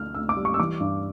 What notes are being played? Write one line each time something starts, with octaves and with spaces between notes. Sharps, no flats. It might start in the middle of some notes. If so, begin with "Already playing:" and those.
Already playing: D2 D3 F6
D2 E6
D6
G3
C#6
E6
E3 D6
G2